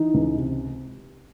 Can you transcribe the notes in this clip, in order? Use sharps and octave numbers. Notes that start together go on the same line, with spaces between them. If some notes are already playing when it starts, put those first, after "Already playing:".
Already playing: E3 D#4
C#2
C3